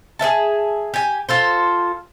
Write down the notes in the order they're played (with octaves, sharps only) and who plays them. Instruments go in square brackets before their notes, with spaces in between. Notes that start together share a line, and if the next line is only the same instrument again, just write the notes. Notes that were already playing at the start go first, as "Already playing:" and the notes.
[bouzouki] G#4 C5 E5 A5
G4 G#5
F4 A4 C5